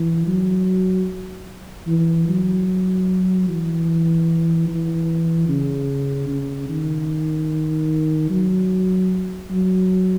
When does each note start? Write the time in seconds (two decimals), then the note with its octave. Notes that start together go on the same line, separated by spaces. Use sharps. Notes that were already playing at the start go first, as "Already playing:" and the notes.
Already playing: E3
0.27 F#3
1.87 E3
2.28 F#3
3.48 E3
4.68 E3
5.49 C#3
6.29 C#3
6.69 D#3
8.30 F#3
9.50 F#3